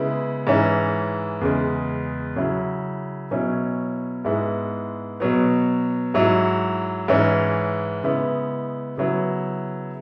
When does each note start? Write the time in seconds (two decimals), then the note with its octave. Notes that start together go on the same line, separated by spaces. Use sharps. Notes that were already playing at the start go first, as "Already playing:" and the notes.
Already playing: C#3 G#3 B3 E4
0.47 G#2 E3 C#4 E4
1.41 E2 C#3 G#3
2.36 C#3 F#3 E4
3.31 B2 F#3 C#4 E4
4.25 G#2 G#3 B3 E4
5.20 B2 F#3 B3
6.14 G#2 F#3 E4
7.08 G#2 E3 C#4 E4
8.04 C#3 G#3 B3 E4
8.97 C#3 F#3 B3 E4